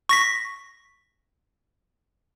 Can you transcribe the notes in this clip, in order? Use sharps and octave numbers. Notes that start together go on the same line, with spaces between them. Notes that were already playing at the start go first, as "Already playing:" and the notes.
C#6 A#6 B6